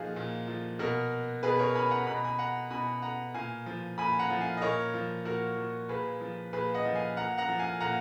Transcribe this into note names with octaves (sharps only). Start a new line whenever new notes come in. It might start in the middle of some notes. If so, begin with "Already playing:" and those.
Already playing: A#2 F3 D#4 F4 F#4 G#4
A#2
F3
B2 F#4 A#4
B2 G#4 B4
A#4 C#5
G#5 B5
F#5 A#5
B2 B5
A#5
G#5 B5
F#5 A#5
B2 G#5 B5
F#5 A#5
A#2 F5 G#5
F3
A#2 G#5 B5
F#5 A#5
F3
F5 G#5
D#5
A#2 A#4 C#5
F3
A#2 F#4 A#4
F3
A#2 G#4 B4
F3
A#2 G#4 B4
D#5 F#5
F3
F5 G#5
A#2 F#5 A#5
F#5 A#5
F3
F5 G#5
A#2 F#5 A#5